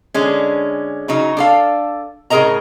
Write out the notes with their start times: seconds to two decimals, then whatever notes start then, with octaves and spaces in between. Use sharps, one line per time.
0.14 D3 G#3 C#4
1.08 C#3 F#3 D#4
1.37 D4 A4 F5
2.30 A2 C#3 G#4 A#4 D#5 A#5